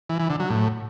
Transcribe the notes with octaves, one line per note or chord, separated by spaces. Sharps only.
E3
E3
D3
F#3
A2